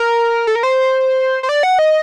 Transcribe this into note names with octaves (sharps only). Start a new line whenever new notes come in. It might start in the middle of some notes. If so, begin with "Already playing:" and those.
Already playing: A#4
A4
A#4
C5
C5
D5
F#5
D#5